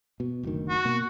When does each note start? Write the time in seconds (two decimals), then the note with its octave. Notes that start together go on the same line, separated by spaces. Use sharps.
0.20 B2
0.43 F#1 D2 D#3
0.69 F#4
0.85 B2 A#3